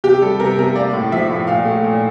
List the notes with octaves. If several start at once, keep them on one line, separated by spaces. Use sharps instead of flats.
C3 G4
G3 A4
C3 A#4
C3 A#4
A#3 D5
A2
F3 E5
A2
A#2 F5
A3
A#2